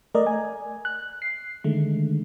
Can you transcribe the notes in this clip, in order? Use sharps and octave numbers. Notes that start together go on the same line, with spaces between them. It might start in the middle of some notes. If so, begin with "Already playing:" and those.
A3 A#4 D5 D#5
G#5
F#6
C7
D3 D#3 G#3 A3